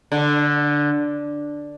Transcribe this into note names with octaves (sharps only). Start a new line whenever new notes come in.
D3